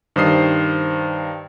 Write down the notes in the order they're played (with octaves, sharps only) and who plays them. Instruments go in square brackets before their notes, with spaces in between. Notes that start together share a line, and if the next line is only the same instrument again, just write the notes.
[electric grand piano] G2 D#3 C5 D#6 C7